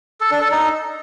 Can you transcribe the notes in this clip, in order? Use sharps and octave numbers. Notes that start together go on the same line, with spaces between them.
A4
D4
A4
D#4